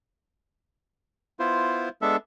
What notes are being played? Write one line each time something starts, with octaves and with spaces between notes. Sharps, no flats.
B3 E4 F4 C5
G#3 B3 D4 A4 E5